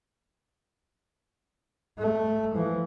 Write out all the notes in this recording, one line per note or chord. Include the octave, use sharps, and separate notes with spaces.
A3
E3 F3